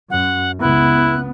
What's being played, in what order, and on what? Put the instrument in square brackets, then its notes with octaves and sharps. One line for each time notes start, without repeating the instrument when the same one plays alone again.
[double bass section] F#2 [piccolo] F#5
[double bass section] C#2 B3 [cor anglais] E4 [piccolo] F#6